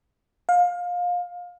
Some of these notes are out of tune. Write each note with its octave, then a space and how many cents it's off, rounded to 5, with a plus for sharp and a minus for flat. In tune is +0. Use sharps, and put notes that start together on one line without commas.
F5 +25